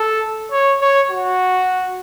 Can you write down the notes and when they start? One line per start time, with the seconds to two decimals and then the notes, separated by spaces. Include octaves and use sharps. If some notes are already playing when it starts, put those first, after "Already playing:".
Already playing: A4
0.52 C#5
0.82 C#5
1.12 F#4